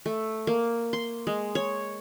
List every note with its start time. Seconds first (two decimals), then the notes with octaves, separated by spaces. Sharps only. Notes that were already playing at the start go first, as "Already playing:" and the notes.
0.06 A3
0.47 A#3
0.93 C6
1.27 G#3
1.55 C#5